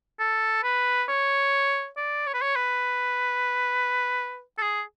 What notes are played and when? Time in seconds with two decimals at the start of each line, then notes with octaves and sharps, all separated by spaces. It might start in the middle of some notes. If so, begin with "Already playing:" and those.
0.20 A4
0.64 B4
1.09 C#5
1.97 D5
2.27 C#5
2.34 B4
2.42 C#5
2.56 B4
4.58 A4
4.62 G#4